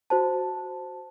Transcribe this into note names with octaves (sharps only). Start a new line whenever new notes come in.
F#4 C5 A5